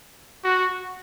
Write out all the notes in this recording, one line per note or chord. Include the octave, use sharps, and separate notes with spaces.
F#4